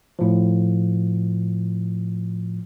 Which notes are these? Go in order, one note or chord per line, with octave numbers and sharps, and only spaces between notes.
A2 F3